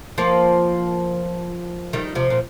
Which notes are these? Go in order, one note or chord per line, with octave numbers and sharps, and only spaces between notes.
F3 A#3
D#3 G3
C3 F3
A#2